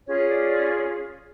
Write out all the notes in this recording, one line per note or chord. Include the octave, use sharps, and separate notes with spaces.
C#4 F4 G#4 C#5
D5
D5